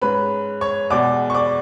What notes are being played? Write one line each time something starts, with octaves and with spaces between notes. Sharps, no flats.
G#2 G#3 C#4 B4 B5
C#5 C#6
E2 B2 G#3 D5 D6
C#6
D5 D6